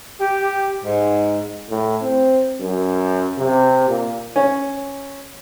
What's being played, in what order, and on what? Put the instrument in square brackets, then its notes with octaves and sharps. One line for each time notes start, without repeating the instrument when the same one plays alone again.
[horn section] G4
G#2
[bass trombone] A2
C4
F#2
C3
A#2
[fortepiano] C#4